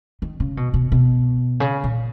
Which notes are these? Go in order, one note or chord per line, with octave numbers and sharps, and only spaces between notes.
D#3
C#3
B2
B2
B2
C#3
A#2